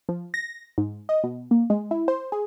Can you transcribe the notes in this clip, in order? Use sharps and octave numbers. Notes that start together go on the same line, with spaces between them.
F3
A#6
G#2
D#5
B2
A#3
G#3
E4
C5
G#4